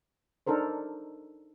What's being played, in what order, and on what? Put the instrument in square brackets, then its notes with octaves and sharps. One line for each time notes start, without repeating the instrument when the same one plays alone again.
[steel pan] D4 D#4 A4 A#4 C5